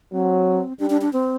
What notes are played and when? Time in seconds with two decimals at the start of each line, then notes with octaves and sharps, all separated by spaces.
0.13 F#3 C4
0.79 G3 D4
0.90 D4
1.01 D4
1.13 C4